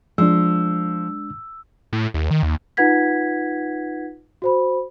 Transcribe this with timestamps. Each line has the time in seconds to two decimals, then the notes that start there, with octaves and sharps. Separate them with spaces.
0.18 F3 G#3 D4 E6
1.93 A2
2.14 D#2
2.31 D#3
2.43 D#2
2.77 D#4 F4 B4 F#5 G#6 B6
4.42 F#4 C5 B5